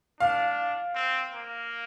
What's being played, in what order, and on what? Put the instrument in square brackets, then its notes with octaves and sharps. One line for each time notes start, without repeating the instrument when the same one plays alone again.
[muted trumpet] D4 [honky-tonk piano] F5
[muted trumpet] C4
A#3